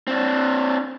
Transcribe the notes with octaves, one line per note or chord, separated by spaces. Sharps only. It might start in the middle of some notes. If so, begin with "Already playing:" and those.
C4 D4